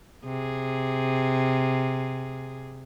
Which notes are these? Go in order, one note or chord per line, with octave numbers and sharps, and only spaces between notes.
C3 G#4